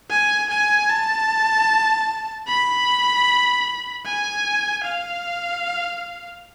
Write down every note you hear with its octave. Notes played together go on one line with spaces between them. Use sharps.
G#5
G#5
A5
B5
G#5
F5